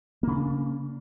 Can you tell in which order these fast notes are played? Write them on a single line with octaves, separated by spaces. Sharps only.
A#3 C#3 D4